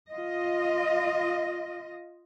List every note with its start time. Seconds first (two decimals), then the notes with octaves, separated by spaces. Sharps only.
0.11 F4 D#5